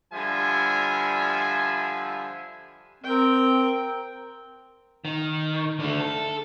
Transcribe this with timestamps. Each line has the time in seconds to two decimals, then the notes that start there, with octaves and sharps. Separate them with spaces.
0.13 D3 F3 G3 E5 G#5
3.04 C4 A#4 G5
5.05 D#3
5.79 D3 A3
6.00 A4